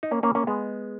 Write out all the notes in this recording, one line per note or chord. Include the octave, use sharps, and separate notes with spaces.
D#4
A#3 C#4
A#3 C#4
A#3 C#4
G#3 B3